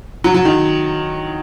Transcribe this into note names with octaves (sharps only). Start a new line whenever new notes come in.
F#3
F#3
D#3